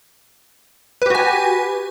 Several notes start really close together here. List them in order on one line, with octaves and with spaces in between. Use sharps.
B4 G4 F#4 G#5